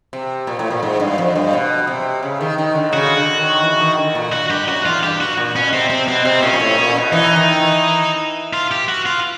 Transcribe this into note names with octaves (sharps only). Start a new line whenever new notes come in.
C3
A#2
A2
A#2
G#2
G2
F2
G2
B2
C3
C#3
D#3
D#3
D3
C#3 F#4
D3
D#3
E3
D#3
D3
A#2
F#4
G2 G4
F#2 F#4
E2 F4
G2 G4
F#4
A#2
B2 C#4
C3 C4
C3 C4
B2 C4
C3 C4
A#2 C#4
A#2
A2
A#2
B2
E3 D#4
D#3
E3
F4
G4
F#4
F4